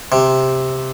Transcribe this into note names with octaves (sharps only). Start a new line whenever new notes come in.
C3